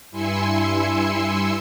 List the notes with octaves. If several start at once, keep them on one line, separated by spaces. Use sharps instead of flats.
G2 E4 G#5 C6 E6 C#7